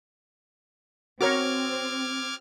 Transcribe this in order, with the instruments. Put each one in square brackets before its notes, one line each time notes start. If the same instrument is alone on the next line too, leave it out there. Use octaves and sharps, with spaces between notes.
[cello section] C4 [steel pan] F#4 A#4 C#5 [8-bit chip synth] D6 F6 G#6